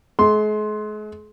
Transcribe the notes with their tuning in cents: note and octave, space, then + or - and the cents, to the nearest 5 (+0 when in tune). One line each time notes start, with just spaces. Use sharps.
G#3 +40 C6 +5